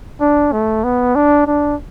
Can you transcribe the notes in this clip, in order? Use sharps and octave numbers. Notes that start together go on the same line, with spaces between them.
D4
A3
B3
D4
D4